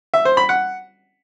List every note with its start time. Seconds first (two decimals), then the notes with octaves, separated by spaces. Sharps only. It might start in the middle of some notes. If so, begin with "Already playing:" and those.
0.14 E5
0.25 C5
0.37 B5
0.49 F#5